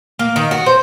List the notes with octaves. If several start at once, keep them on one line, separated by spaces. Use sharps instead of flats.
A#3
D#3
F#4
C5